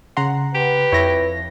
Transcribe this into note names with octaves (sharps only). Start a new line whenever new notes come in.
C#3 F#5 A#5 C6
G4 B4
F2 E4 C#5 A#6